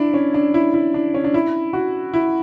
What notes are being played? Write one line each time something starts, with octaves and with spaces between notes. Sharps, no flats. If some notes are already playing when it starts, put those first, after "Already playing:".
Already playing: D4 E4
C#4
D4
E4
E4
D4
C#4
D4
E4
F#4
E4